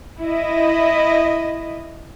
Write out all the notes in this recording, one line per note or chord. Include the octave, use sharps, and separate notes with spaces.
E4 D#5